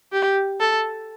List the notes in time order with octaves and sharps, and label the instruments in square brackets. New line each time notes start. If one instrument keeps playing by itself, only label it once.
[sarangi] G4
A4